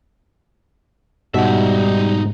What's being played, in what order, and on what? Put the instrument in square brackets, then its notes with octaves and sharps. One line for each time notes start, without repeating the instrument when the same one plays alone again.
[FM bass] G#2 [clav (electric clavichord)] B2 [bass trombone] G3 [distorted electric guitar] D#4 E5